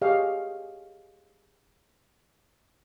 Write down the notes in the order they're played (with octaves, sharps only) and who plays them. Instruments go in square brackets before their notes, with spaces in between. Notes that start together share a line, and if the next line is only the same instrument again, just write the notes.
[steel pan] G4 G#4 C#5 D#5 F5